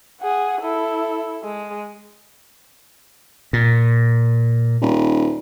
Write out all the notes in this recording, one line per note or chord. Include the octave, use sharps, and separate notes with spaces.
G#4 F#5
E4 A4
G#3
A#2
D#1